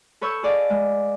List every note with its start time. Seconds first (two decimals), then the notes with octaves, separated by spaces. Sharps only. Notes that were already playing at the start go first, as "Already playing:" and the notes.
0.21 A4 B4 C#5 C#6 E6 G6
0.43 G#4 D5 D#5 F5 A5
0.70 G#3